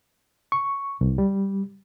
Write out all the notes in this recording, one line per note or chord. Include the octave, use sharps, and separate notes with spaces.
C#6
C2
G3